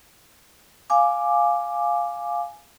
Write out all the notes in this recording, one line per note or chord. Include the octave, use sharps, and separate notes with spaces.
F5 G#5 D6